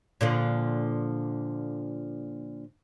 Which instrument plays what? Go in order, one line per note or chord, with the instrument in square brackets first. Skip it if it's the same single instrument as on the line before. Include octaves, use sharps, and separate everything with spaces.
[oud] A#2 D3 F3